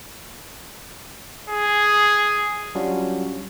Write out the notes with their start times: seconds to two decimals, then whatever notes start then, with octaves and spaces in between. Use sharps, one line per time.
1.50 G#4
2.75 F#3 G3 C#4 D4 F4 F#4